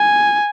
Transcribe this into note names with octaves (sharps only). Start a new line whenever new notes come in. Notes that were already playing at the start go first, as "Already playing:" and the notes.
Already playing: G#5